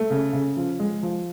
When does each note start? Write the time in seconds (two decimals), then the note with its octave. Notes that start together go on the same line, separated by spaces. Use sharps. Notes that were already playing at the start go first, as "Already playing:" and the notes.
Already playing: A3
0.10 C#3
0.33 C#3
0.57 F3
0.80 G#3
1.03 F3